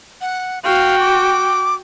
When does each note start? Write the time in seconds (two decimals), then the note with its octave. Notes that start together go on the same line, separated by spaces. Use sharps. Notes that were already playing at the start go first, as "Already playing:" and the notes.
0.21 F#5
0.64 F#4 F5 G5
1.00 D6